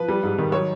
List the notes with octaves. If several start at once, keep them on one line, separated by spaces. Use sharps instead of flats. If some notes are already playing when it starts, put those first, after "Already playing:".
Already playing: F3 B4
G3
G#2
D#3
F#3 C#5